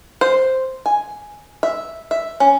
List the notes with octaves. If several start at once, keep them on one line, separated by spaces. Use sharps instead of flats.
C5
G#5
E5
E5
C#4